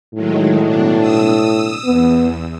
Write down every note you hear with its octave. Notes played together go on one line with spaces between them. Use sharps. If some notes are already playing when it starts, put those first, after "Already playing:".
A2 D#3 F#3 G#3
B2 D4
D#6 E6
E2 B3